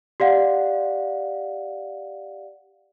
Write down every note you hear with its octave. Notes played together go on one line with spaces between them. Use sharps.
G4 D5 F5 F#5